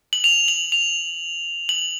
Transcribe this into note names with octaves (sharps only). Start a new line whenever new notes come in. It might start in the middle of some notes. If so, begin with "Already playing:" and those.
F#7
F7
F#7
F7
F#7